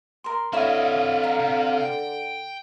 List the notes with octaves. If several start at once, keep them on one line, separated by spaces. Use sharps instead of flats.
A#4 C6
D3 C4 E4 C#5 D#5 F5
A#5
C3
G5